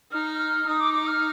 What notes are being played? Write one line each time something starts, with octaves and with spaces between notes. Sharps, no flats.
D#4 F6
F6
D#4 D#6
D6
D6
F6